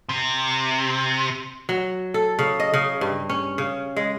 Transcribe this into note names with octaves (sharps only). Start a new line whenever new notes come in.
C3
F#3
A4
C#3
D#5
C#3
G2
C#4
C#3
G#3